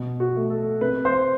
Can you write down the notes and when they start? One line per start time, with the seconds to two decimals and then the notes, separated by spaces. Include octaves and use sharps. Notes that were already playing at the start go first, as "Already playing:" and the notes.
Already playing: B2
0.20 F#4
0.36 A3
0.50 A4
0.81 C3 B4
1.05 C5